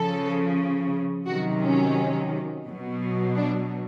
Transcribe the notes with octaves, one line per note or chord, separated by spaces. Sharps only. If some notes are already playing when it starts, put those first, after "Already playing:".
Already playing: C#3 F3 A4
C3 D#3 F#3 F#4
C#4
B2 F#3
D4